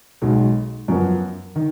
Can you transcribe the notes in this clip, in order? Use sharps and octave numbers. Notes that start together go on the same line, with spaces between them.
B1 B2 G#3
F#2 F3 B3 F#4 A#4
D#3